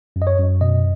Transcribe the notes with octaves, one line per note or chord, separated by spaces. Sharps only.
F#2
D#5
C#5
F#2
B2 D#5